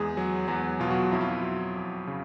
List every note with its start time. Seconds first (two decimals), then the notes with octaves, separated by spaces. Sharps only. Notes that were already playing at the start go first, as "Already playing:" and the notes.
Already playing: E2 G#3 G#4
0.17 F#3
0.48 E2 F#3 F#4
0.80 B2 F4
0.90 F#3 F#4
1.12 F2 E4
1.21 F4
1.31 E4
1.43 F#3
1.76 F2
2.07 C#3